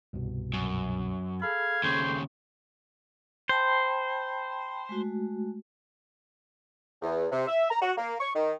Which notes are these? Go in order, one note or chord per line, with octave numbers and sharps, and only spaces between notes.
C2 G2 B2
F#2
G#4 A4 F5 B5 G#6
D#2 C#3 C5
C5 G5 A5 B5
G#3 A3 F#4
E2
C3
E5
A#5
F#4
A#3
C#6
D#3